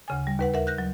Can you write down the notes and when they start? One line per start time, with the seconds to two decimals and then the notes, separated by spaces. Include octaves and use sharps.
0.08 D2 C#3 G#5
0.27 G3
0.39 D#2 B4 F#5
0.54 A#4 E5 F#5
0.67 F#6 G6 A#6
0.78 F#3